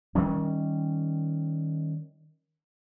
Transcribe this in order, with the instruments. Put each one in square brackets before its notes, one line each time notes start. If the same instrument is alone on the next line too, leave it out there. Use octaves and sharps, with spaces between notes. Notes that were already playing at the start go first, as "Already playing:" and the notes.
[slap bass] D#3 G3 C#4